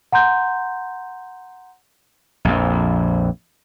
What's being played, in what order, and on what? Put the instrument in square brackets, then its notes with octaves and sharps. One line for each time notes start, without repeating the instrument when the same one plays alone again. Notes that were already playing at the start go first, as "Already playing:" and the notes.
[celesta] F#5 A#5 C6 G6
[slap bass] A#1 F2